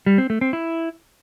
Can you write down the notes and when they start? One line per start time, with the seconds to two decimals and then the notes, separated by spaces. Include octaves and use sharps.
0.06 G3
0.18 C4
0.30 A3
0.41 C4
0.53 E4